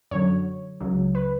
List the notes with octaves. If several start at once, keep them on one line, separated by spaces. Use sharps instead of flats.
F#2 D3 F#3 C#5
C#2 C#3 F#3
B4